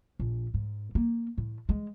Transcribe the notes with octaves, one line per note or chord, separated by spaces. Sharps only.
A#1
G#2
A#3
A2
G#3